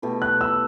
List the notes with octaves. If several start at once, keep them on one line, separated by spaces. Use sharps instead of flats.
B2 A3 E4 G4
F#6
E6